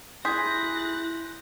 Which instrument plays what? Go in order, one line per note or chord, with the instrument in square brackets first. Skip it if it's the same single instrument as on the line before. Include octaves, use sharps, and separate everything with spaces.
[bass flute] E4 [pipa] G#4 [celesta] C6 G6 B6 [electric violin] F#6 A#6